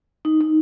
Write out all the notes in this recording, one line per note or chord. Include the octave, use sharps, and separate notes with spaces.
D#4
D#4